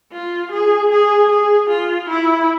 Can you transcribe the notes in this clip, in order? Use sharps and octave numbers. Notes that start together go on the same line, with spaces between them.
F4
G#4
G#4
G#4
F4
E4